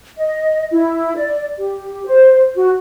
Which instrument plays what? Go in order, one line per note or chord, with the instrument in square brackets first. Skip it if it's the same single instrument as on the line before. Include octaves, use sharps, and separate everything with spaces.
[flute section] D#5
E4
D5
G4
C5
F#4